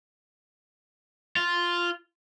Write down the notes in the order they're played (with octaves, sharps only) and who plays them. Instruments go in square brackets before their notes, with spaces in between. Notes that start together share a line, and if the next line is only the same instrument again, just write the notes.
[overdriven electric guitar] F4